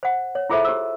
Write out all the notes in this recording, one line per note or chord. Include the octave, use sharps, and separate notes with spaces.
C5 F#5
C#5
E4 F4 G#4 A4 C5 E5
G4 C5 E6